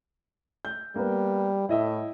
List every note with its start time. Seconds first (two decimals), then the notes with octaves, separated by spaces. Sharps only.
0.65 G6
0.96 G3 A#3 B3
1.69 A2 E4 D#5 E5